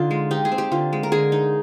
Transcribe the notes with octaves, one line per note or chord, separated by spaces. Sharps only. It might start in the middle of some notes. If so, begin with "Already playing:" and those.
Already playing: D3 D#4 F4
G#3
D#4 G4
G#4
C4
G4
D3 F4
G#3
A#4
D3 G#4
D#4